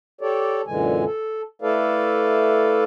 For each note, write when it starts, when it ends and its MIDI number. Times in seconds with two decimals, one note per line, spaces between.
0.21 0.62 67
0.21 0.62 69
0.21 0.62 73
0.21 0.62 74
0.67 1.04 42
0.67 1.04 46
0.67 1.04 50
0.67 1.04 52
0.67 1.04 56
0.67 1.04 80
1.04 1.42 69
1.62 2.84 57
1.62 2.84 64
1.62 2.84 69
1.62 2.84 71
1.62 2.84 74
1.62 2.84 77